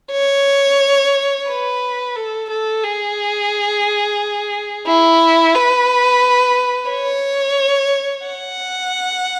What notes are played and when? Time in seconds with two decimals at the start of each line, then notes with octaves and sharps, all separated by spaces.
0.12 C#5
1.48 B4
2.15 A4
2.50 A4
2.83 G#4
4.87 E4
5.55 B4
6.90 C#5
8.26 F#5